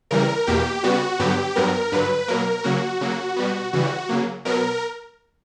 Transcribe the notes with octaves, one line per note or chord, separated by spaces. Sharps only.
C#3 E3 G3 A#4
E2 B2 A#3 G4
C#3 G3 B3 F#4
G2 D3 F#3 B3 G4
G2 F#3 B3 A#4
G2 D3 F#3 B4
B2 F#3 A#3 A#4
C#3 F#3 A#3 F#4
C#3 F#3 A#3
B2 G3 B3
C#3 E3 G3 F#4
C#3 F#3 A#3
B2 F#3 B3 A#4